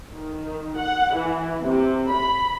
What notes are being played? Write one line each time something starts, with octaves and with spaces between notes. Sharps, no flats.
D#3
F#5
E3
C3
B5